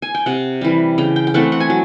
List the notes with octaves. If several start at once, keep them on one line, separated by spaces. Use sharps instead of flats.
G#5
G5
C3 F#5
E3 G3
C#3 G5
G5
G5
E3 A3 C4 F#5
F#5
G#5
F#3